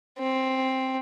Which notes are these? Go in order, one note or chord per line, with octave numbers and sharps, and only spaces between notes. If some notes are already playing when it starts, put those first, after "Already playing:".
C4